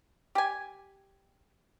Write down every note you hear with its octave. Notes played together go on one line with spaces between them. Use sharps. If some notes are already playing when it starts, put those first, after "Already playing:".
G4 G#5